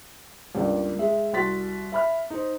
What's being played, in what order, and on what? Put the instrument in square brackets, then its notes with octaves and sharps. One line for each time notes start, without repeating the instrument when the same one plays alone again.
[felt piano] C#2 G2 A#3 D5
G#3 E5
C2 F#4 C6 A6 B6
E5 B5 F6
D#4 C5